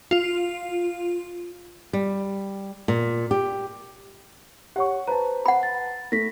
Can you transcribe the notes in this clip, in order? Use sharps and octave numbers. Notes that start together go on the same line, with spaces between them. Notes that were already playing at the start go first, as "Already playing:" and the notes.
F4
G3
A#2
G4
G4 C#5 F#5 C#6
B4 C5 A5 A#5
F#5 B5
A6
A3 A#6 B6